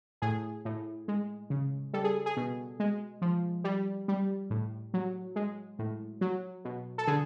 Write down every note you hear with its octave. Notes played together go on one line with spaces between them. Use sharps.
A2 G#4
A2
G#3
C#3
G3 A4
G#4
G#4
B2
G#3
F3
G3
G3
A2
F#3
G#3
A2
F#3
B2
A4
D3 G#4